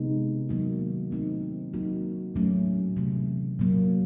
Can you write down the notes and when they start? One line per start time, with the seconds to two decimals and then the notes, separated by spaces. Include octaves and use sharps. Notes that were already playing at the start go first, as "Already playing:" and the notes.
Already playing: C3 F3 G#3 B3 D#4
0.49 D#3 F#3 A#3 D#4 F#4
1.11 A3 C4 D#4
1.73 F#3 A#3 D#4 F#4
2.35 A#2 F#3 A3 C#4
2.97 C3 E3 A3
3.59 A#2 F#3 A#3